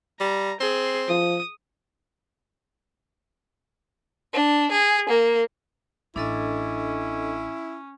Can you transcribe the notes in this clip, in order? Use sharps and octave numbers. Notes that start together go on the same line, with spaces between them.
G3 A#5
C4 G#4
F3 D#6
D4
G#4
A#3
A1 C#4 D4 E4 A4 D#5